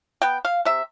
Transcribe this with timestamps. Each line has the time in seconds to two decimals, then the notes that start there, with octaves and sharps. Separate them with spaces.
0.22 B3 G5
0.45 F5
0.65 C3 E5